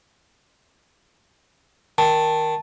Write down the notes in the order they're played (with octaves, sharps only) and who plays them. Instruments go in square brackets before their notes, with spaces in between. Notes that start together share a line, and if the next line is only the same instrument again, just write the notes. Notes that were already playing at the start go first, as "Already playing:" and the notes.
[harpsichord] D#3 [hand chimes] A5